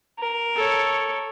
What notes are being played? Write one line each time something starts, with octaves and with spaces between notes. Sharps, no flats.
A#4
A4 C#5